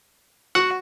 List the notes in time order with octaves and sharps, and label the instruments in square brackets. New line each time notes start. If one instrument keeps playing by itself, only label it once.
[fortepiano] F#4 [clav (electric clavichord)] F#5